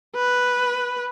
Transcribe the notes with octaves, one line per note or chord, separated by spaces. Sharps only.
B4